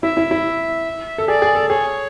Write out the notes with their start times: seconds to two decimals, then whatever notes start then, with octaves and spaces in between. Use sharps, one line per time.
0.02 E4 E5
0.17 E4
0.31 E4
1.18 A4
1.28 G#4 D5
1.42 G#4
1.55 A4
1.69 G#4 C#5